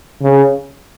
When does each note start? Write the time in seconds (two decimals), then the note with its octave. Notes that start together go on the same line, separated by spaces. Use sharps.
0.23 C#3